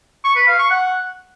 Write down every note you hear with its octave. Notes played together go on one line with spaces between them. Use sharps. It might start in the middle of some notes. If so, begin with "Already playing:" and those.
C#6
B4
F5
C#6
F#5